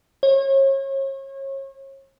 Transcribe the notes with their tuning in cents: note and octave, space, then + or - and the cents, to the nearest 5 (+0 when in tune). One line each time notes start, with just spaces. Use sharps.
C#5 -35